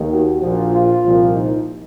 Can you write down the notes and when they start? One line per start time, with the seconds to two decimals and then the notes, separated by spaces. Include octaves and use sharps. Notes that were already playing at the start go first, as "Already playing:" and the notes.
Already playing: D#2 D#3
0.12 F#4
0.42 A#1 A#2 F3
0.73 F4
1.04 C2 A#2 F3
1.35 D#4